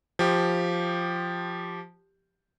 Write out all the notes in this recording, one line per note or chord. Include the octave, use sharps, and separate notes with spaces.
F3 G4